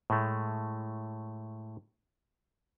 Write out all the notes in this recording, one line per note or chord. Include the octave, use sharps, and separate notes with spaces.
A2 G#3 A3